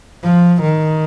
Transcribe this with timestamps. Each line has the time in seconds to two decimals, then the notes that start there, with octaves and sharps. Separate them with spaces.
0.23 F3
0.62 D#3